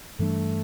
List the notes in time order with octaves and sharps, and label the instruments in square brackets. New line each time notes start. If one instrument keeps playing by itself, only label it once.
[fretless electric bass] G2 E3 G3 D4 [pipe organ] A3